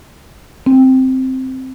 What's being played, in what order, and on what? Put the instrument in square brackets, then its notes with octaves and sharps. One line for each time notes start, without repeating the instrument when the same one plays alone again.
[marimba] C4